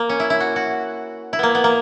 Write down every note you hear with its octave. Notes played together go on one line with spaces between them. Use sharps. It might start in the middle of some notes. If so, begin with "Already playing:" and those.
Already playing: A#3
C#4
E4
E4
F#4
F#4
E4
A#3 B3
B3
A#3